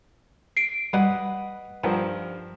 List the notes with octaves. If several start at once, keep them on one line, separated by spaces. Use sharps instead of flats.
C7 D7
G3 B4 D#5 F#5
G2 F3 B3 A#4